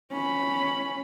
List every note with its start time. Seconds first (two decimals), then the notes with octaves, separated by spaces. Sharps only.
0.12 C#4 B5